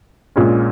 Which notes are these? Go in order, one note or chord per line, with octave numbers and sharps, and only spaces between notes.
A#1 A#2 G#3 C#4